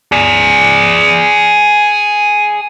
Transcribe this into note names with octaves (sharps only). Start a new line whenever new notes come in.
G#4 D5